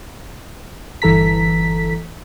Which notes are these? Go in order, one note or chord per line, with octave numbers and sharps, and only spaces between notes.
G1 E3 A4 A#5 B6